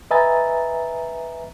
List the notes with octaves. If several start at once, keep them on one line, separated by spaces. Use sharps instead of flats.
B4 D#5 E5 G#5 A#5 A6